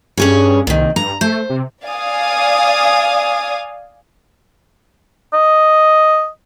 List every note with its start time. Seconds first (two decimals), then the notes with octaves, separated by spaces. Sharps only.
0.17 G2 C#4 G#4 C#5
0.67 C2 A#2 D#3
0.96 G2 A#5
1.21 A3 C5
1.50 C3
1.85 D5 F5 G#5 D#6
5.34 D#5